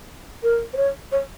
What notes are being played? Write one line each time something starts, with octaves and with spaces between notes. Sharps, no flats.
A#4
C5
C#5
C#5